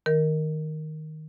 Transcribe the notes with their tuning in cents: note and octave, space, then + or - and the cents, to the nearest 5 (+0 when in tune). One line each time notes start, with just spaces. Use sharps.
D#3 +0 A#4 +0